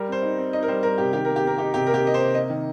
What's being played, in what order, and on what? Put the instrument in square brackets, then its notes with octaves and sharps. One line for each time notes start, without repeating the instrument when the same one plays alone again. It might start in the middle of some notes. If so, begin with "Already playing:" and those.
Already playing: [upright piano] G3 A#4
C4 C5
D#4
C4
D#4 D#5
A#4
G3 C5
G3 A#4
C3 G4
D#3 G4
A#3 A#4
G4
A#3 A#4
D#4 G4
C3 G4
A#4
A#3 G4
A#3 D#5
C3 C5
A#3 D#5
D#3